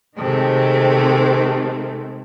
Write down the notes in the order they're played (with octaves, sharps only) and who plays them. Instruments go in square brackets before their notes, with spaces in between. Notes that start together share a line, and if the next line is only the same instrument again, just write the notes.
[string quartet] C3 D#3 G#3 A3 C4